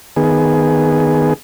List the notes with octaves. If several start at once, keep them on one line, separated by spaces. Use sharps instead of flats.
D#3 B3 G#4